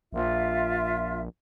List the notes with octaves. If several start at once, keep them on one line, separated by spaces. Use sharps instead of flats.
A#1 F4 E5